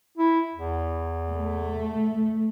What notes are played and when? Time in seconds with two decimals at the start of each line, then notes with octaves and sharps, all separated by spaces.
0.18 E4
0.53 E2
1.28 A3